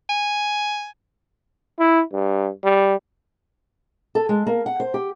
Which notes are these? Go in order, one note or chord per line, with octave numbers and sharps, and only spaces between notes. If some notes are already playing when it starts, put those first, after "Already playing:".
G#5
E4
G2
G3
A4
G#3
A#3
F#5
C5
G4